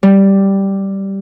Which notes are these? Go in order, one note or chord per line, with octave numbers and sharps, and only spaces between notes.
G3